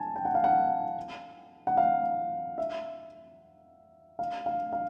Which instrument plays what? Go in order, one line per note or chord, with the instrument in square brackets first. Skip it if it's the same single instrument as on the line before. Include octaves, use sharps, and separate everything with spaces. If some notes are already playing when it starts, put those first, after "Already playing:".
Already playing: [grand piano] G#5 A5
G5
F#5
F5
F#5
F#5
F5
E5
F5
F5
F5